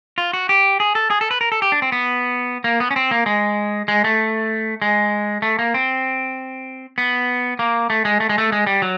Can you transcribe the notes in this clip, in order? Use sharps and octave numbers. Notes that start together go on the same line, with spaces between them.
F4
F#4
G4
G#4
A4
G#4
A4
B4
A#4
A4
G4
D4
C4
B3
A#3
B3
C#4
C4
A#3
G#3
G#3
A3
G#3
A3
A#3
C4
B3
A#3
A3
G#3
A3
G#3
A3
G#3
G3
F#3